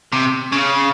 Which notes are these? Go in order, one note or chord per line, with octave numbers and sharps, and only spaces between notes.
C3
C#3